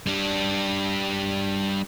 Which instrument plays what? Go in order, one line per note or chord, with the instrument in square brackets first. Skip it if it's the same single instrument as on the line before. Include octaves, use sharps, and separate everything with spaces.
[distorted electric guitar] G3 D4